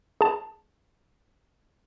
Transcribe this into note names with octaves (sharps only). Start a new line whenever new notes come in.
G#4 A5